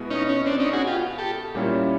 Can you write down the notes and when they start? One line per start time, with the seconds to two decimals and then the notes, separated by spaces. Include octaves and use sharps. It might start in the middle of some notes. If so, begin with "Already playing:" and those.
Already playing: B2 G#3 B3 E4
0.11 C#4 D#4
0.29 C#4
0.46 C4 D4
0.60 C#4 D#4
0.73 F#4 G#4
0.87 F4 G4
1.18 G4 A4
1.55 A#2 G3 A#3 C#4 E4